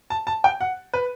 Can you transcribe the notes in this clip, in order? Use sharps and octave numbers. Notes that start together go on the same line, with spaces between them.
A5
A5
G5
F#5
B4